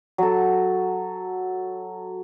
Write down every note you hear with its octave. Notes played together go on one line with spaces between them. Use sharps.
F#3 A4